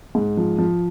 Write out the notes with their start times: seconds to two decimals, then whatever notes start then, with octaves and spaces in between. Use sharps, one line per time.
0.15 G#2
0.37 F3
0.59 F3